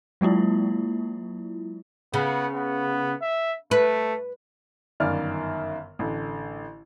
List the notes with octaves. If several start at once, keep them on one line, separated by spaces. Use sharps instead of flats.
F#3 G#3 A#3 E4 F4
C#3 B3
B3
E5
A3 B4
G1 F#2 D#3 D5 F5 F6
A1 D3